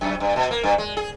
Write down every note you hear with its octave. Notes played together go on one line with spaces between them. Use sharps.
F#2
G2
B2
A#3
G2
G#3
G#4